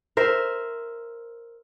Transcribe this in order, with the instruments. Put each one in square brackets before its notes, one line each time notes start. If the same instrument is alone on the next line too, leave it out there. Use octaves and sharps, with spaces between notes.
[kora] A#4 C5 E5